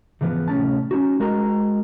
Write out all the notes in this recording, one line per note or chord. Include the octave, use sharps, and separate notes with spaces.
C#2 G#2 E3 F3 B3
C2 A2 C#4 A5
C#4 D#4 F#4
G#3 F#4 A#4 D#5 A#5